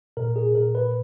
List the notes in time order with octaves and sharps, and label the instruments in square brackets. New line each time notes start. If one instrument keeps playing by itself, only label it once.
[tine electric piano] A#2 A#4
G#4
A#2 A#4
B4